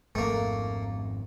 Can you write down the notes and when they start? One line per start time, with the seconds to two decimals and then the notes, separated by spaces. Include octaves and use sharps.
0.15 G#1 F2 A3 A#3